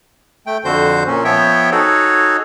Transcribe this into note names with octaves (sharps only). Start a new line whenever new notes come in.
A3 G5
F2 D3 F#4 C5 G6
A#2 C#4
F3 B3 C#5 E5 G5
D#4 F#4 G#4 A4 C#5